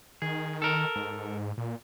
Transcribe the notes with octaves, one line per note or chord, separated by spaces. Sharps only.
D#3 G#4
A4 A#4
G#2
A#2